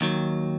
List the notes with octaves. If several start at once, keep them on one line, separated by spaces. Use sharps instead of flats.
D#2 D#3 F#3